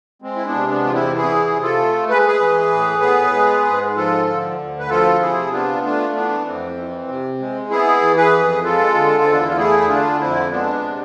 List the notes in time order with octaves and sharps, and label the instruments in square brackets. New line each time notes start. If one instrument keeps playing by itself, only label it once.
[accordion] G#3 C4
E4
B3 D4
C3
B3 D4
E2 F4
C4 E4
E3 E4 G#4
C3
F4 A4
A3
G#3 B4
G#4 B4
E3
A2
B3
G#3
G#2
F3 F4 A4
D3
D2
B4
F3 F4 A4
C3 E4 G#4
B3 D4 F4
A3 D4 F4
E3 B3 D4
F2 C4
E3
C3
G#3
B3 E4 G#4
E3
G#4 B4
F2
G#3 F4 A4
D3
E2 C4
D4
E4
F4
A3 E4 G#4
E4
D3 D4 F4
F2 C4 E4
G#3 B3 D4
C3